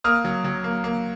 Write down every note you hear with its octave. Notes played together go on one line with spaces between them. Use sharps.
A#3 D#6 F6
F#3
F#3
A#3
A#3